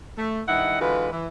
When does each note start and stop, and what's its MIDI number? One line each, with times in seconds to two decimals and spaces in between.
0.18 0.40 57
0.48 0.77 43
0.48 0.77 51
0.48 0.77 64
0.48 0.77 75
0.48 0.77 78
0.80 1.08 50
0.80 1.08 52
0.80 1.08 56
0.80 1.08 65
0.80 1.08 66
0.80 1.08 71
1.11 1.27 52